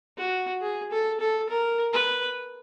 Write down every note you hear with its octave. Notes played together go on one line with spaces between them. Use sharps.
F#4
G#4
A4
A4
A#4
B4